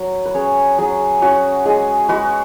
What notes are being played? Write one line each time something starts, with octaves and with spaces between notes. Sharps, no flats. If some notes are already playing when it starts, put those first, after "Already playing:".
Already playing: F#3
B4
C#4 G#4 C#5
F#3 G#4
C#4 F#4
G#3 G#4
G#3 F#4 B4